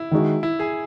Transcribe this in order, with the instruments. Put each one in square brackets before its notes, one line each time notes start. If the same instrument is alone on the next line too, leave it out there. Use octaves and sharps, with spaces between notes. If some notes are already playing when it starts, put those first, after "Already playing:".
Already playing: [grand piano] E4
[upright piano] D#3 G#3 D#4 F#4
[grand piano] E4
G#4